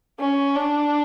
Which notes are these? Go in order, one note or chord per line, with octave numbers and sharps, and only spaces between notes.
C#4
D4